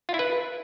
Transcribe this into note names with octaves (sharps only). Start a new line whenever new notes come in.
F4
E4
B4